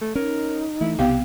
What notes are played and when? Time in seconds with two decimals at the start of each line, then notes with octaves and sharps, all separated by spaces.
0.01 A3
0.15 C#4 D#4 A#4
0.81 E3 A3 E4
0.99 B1 C3 B3 G4 F5 G5